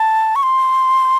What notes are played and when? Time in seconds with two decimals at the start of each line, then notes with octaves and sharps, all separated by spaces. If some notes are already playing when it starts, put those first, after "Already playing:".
Already playing: A5
0.36 C#6
0.43 C6